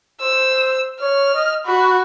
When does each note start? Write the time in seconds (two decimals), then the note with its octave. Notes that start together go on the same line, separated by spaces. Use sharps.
0.21 C5 E6
1.01 C#5 F6
1.34 D#5
1.66 F#4 B5